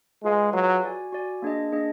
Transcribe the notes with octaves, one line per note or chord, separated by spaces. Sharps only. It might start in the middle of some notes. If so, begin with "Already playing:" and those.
G#3 F4 G#4 B4 F5 G#5
F#3 F4 G#4 B4 F5 G#5
F#4 D5 G#5
F#4 D5 G#5
A#3 D4 G#4 D#5
A#3 D4 G#4 D#5